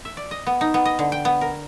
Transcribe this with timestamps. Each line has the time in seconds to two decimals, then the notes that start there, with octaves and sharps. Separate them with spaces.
0.05 E5
0.17 D5
0.31 D#5
0.47 B3
0.61 D#4
0.74 B3
0.85 D#5
0.99 D3
1.12 G5
1.25 B3
1.41 A#4